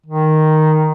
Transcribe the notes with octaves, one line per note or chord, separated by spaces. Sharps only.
D#3